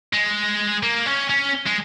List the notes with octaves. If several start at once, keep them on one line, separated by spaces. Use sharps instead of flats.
G#3
A#3
C#4
C#4
G#3